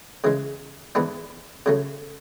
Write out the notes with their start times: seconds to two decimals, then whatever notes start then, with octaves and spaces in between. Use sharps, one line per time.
0.24 C#3 E3 G#3
0.95 G#2 E3 B3 D4
1.66 C#3 F#3 A3